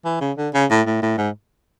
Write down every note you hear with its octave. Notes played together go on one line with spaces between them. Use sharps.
E3
C#3
D3
C#3
A2
A2
A2
G#2